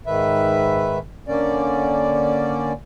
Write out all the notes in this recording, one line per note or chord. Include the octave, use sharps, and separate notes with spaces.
G#2 D#3 B4 E5
D3 A#3 C#4 D5